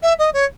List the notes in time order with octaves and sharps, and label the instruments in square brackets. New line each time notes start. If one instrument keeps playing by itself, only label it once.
[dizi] E5
D#5
C#5